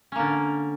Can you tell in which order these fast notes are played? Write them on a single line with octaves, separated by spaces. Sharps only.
C#4 A#3 D3